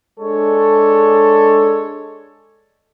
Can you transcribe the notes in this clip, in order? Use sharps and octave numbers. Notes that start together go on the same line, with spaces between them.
G#3 D4 A4 C#5